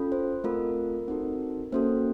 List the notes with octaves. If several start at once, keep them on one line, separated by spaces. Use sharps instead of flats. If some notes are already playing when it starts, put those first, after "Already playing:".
Already playing: C#4 F4 A4
C5
A3 C4 F4 A4 A#4
C4 D#4 F#4 A4
A#3 C#4 F#4 A4 C5